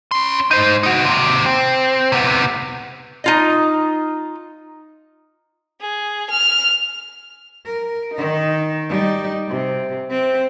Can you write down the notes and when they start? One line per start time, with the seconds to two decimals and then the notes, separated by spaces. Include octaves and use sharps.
0.11 C#4 C6
0.51 D#4 C5
0.83 D#4 F#4
1.05 D#2 C3
1.46 C4
2.12 C3 B3
3.24 D#4 F4 D#5
5.82 G#4
6.30 F6
7.66 A#4
8.15 D#3 D#4
8.89 G3 D#4
9.49 C3
10.10 C4